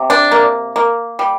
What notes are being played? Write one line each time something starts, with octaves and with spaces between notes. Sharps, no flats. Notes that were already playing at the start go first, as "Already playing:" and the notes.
Already playing: C3
D4
A#3
A#3
G3